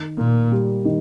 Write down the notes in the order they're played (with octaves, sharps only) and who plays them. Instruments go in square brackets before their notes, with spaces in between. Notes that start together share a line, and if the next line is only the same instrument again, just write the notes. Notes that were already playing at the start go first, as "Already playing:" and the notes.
Already playing: [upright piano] D#3
[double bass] A#2 [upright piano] A#3
[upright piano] G3
D#3